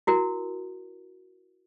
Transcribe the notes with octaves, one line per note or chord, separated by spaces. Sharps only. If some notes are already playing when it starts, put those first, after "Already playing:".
E4 F#4 A#4